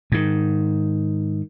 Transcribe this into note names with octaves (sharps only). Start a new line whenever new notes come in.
G#2 D#3